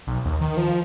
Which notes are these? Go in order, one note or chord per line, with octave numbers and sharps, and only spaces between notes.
B1
D#2
D#3
F3